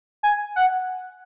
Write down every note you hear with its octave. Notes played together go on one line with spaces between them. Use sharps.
G#5
F#5